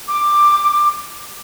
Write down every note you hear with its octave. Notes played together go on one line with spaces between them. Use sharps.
D6